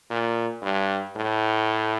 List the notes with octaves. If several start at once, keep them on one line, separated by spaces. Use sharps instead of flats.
A#2
G2
A2